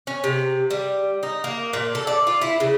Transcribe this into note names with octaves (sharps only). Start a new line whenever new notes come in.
C#4
C3
G3
D#4
A#3
A#2
A4
D5
F4
E4
C#3